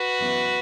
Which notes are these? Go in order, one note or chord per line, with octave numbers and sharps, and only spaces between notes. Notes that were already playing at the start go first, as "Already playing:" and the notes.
Already playing: F#4 B4
F#2 E3 B3